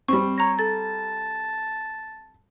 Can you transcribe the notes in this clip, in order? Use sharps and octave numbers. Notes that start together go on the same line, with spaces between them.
G3 C4 C#6
C#5 A#5 A#6
A4 A5 A6